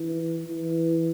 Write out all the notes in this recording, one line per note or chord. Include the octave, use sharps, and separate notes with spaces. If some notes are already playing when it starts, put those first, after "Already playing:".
Already playing: E3
E3